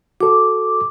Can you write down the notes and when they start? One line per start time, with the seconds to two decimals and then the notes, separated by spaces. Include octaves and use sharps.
0.21 F#4 A4 D6